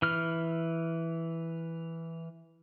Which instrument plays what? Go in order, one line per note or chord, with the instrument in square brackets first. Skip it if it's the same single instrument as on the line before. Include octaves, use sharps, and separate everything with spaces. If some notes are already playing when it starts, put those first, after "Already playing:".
[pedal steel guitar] E3 F6